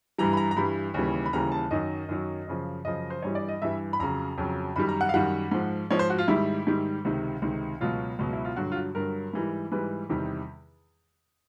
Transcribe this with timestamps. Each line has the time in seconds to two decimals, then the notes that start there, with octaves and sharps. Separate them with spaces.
0.18 G2 E3 G3 A#5
0.33 B5
0.37 A#5
0.51 A#5
0.56 G2 E3 G3 B5
0.94 D#2 C#3 E3 G3
1.26 B5
1.33 D#2 C#3 E3 G3 A#5
1.52 A5
1.71 F#2 D#3 F#3 D#5
2.08 F#2 D#3 F#3
2.47 F#2 C#3 F3
2.85 F#2 C#3 F3 D#5
3.10 C5
3.22 G2 E3 G3 C#5
3.35 D5
3.48 D#5
3.62 G2 E3 G3 E5
3.93 B5
3.99 F2 C#3 F#3 A#5
4.38 F2 C#3 F#3
4.76 F#2 D#3 G3 B5
4.89 A#5
5.01 F#5
5.09 F5
5.14 F#2 D#3 G3 F#5
5.52 G#2 F3
5.90 G#2 F3 C#5
5.99 C5
6.10 F#4
6.18 F4
6.28 G#2 D#3 G3 E4
6.67 G#2 D#3 G3
7.05 C#2 C3 D#3
7.42 C#2 C3 D#3
7.81 C#2 B2 F#3 F4
8.19 C#2 B2 F#3
8.33 E4
8.45 F4
8.56 G2 D3 F#3 F#4
8.72 F4
8.76 F#4
8.95 G2 D3 F#3 A#4
9.33 G#2 E3 G3
9.72 G#2 E3 G3 B4
10.09 E2 C3 D#3 G3